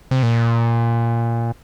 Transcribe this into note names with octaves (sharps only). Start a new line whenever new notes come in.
C3
A#2